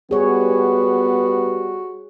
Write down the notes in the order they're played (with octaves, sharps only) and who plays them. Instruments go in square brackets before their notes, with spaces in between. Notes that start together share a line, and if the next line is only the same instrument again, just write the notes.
[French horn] G3 [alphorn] B3 [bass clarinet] F#4 [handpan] G#4 C#5